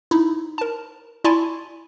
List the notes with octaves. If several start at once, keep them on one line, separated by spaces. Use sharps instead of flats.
D#4 E4
A#4 A5
E4 D5 G#5 A5 C6 C#6